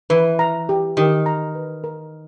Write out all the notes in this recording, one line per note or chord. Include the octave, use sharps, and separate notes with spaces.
E3 B4
A#5
G4
D#3 G4
A#5
B4
A#4